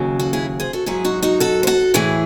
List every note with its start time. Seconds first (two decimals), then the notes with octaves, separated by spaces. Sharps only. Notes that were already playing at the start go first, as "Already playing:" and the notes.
Already playing: D#2 C#3 F#3
0.20 F#4 A4
0.33 E4 G#4
0.60 G#4 C5
0.73 F#4 A4
0.86 G#2 F#3 E4 G#4
1.05 D#4 F#4
1.22 D#4 F#4
1.40 F#4 A4
1.63 C5
1.67 F#4 A4
1.94 A2 E3 E4 G#4